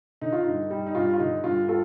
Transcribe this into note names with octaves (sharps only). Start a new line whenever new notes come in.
D3 D#4
F4
G2 D#4
G3
D#4
G2 F4
F4
D3 D#4
G2 F4
G3 F4 A4